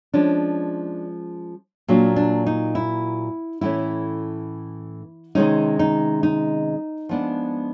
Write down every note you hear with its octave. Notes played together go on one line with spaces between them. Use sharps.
F3 G#3 C#4 D4
A#2 F#3 A#3 D4
D4
D#4
E4
A2 E3 A3 C#4 E4
C3 D#3 G#3 C#4 D#4
D#4
D#4
F3 G#3 B3 D4